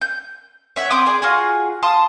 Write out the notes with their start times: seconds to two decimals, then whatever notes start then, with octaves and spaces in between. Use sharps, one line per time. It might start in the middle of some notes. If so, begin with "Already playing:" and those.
0.01 G6
0.76 C#5 E5 F#5
0.90 C4 C6 D6 D#6
1.06 G#4 D5
1.22 F4 F#4 G#4
1.83 F5 A5 C6 D#6